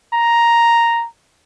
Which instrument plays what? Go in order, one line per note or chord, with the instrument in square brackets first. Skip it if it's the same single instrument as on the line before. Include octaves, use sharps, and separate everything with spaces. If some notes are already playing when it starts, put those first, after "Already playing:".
[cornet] A#5